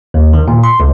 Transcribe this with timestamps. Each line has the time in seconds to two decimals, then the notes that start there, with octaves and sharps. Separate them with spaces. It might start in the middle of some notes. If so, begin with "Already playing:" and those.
0.14 D#2
0.33 D#3
0.48 A#2
0.64 C6
0.80 C#2